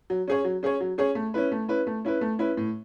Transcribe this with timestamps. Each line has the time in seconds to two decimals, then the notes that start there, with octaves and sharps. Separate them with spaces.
0.10 F#3
0.28 C#4 G#4 C#5
0.45 F#3
0.63 C#4 G#4 C#5
0.81 F#3
0.98 C#4 G#4 C#5
1.15 A3
1.34 C#4 E4 B4
1.52 A3
1.68 C#4 E4 B4
1.87 A3
2.05 C#4 E4 B4
2.21 A3
2.39 C#4 E4 B4
2.57 A2